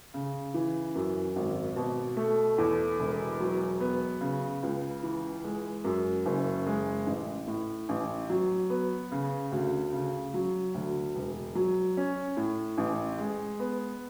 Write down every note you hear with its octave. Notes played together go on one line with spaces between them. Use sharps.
C#3
E3
F#2
G#1
B2
A3
E2
E1
F#3
B3
C#3
C#2
E3
G#3
F#2
F#1
G#3
A1
A2
A1
F#3
B3
C#3
D2
C#3
F#3
D2
E1
F#3
C#4
A2
A1
G#3
B3